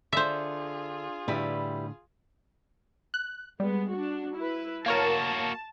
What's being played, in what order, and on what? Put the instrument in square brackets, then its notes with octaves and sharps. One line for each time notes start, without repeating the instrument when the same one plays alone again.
[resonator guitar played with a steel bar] D3 [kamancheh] F4 G#4 [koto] C5 E5
[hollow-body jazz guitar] A2 D3 [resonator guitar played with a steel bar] G3 E4 B4
[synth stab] F#6
[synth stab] G3 [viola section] G#3 B3
[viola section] D4 F#4
E4 B4
[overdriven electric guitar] A#3 F#4 [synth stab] A#4 C#5 F5 [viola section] A5